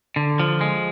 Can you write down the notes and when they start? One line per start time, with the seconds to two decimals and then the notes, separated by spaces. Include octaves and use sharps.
0.16 D3
0.40 F3
0.61 G#3